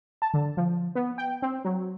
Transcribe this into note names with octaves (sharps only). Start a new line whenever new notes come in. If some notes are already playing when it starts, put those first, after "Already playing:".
A5
D3
F3
B3
G5
C4
F#3